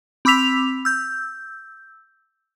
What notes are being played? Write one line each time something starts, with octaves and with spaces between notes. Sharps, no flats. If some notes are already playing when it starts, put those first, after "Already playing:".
C4 B5 D6 E6 B6 F7
E6 G6